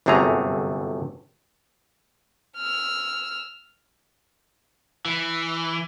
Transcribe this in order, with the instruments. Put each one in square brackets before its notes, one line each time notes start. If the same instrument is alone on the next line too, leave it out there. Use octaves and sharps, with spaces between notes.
[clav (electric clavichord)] G1 F#2 C3 A3 G#4 A#5
[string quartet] E6 F6
[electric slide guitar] E3